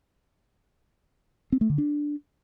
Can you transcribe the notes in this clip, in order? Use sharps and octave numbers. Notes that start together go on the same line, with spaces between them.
C4
A3
D3
D4